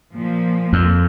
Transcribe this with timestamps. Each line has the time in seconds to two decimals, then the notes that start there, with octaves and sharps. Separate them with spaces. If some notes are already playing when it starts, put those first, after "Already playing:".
0.13 A#2 F3
0.73 F2